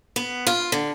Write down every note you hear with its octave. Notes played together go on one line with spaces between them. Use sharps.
B3
F4
D3